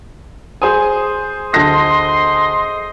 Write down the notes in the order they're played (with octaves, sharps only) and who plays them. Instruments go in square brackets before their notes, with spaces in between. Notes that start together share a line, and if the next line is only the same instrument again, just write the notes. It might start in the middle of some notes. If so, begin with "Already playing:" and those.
[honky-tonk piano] G#4 C5 D#6 [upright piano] G#5
[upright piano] D2 A5 A#6 [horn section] D#5 C6